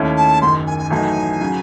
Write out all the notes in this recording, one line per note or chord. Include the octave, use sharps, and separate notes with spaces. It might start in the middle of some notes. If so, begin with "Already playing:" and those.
Already playing: D#2 D#3 A3 C#4 E4
A5
F#1 F#2 D#3 C6
G#5
G#5
A1 A2 F#3 A3 D#4 G#5
C#3 F#3